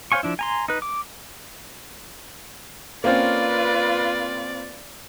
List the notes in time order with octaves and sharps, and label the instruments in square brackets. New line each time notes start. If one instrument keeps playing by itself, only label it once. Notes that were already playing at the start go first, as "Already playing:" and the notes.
[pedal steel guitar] C5 C#5 F5 G#5 C#6
F3 D4 E4
G#5 A#5 C6
D#4 B4
D6
[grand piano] A#3 C4 C#4 [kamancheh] F4 B4 [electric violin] D5